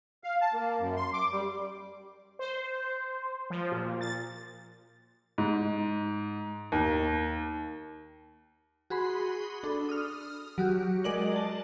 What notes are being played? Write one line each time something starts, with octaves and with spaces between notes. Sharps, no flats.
F5
A5
A#3
F#2
C6
D6
G3
C5
F3
A#2
A6
G#2
D#2
F#4 G#4 B5 C6
D4 A4
D#6 F6
F#3 F#4 G4
G#3 G#4 A#4 D5 D#5 F#7
A5